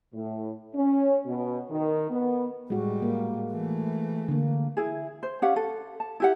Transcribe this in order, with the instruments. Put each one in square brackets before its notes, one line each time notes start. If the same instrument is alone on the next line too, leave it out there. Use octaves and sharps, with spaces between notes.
[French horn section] A2
C#4
B2
D#3
B3
[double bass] A2 G3 [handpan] G#3 F#4
[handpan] A#3
[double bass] E3 A3
[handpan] D3 A#3
[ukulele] E4 G#4
C5
C#4 G4 F5 F#5
A4
A5
E4 G4 F#5